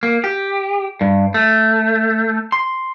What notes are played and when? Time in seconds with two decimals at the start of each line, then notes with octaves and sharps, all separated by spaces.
0.03 A#3
0.24 G4
1.01 G2
1.34 A3
2.52 C6